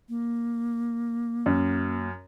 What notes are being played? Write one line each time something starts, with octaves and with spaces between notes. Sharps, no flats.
A#3
F#2